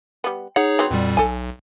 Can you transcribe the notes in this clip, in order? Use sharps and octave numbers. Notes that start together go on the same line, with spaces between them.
G3 B3
D#4 G#4 C#5 F#5
F#3 B3 C4
F2 A#2 G3
B1 A4 G#5